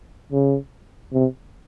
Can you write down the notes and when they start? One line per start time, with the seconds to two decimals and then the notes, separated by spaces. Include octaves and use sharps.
0.32 C#3
1.13 C3